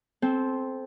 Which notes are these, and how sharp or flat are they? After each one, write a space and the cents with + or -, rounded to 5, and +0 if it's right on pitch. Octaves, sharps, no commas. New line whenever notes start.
C4 +0 A4 -25 C6 +0